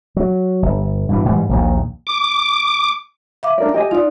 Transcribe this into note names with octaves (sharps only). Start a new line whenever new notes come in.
F#3
G1
G2 B2 E3
G#2 E3 G3
A#1 D#2 A#2
D6
E5 F5 D6
D4 A#4 D5
G4 D#5 G#5
D#4 F4 D5